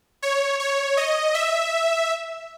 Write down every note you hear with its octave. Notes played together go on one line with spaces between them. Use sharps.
C#5
C#5
D#5
E5